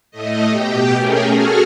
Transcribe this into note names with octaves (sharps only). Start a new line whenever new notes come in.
A2 A3 D#5
B2 G4 G5
A3 C#4 G#4 A#4
F#4 G#4 A4 F6